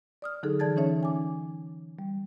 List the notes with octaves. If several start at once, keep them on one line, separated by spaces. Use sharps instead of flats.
D5 D#6 F6
D3 F#3 D#4 G#4 A4
E3 D5 A5 G#6 A6
E3 C#4 D#4 C#5 E5
G#5 D6
G3